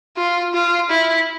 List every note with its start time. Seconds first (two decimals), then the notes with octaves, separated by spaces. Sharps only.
0.17 F4
0.54 F4
0.90 E4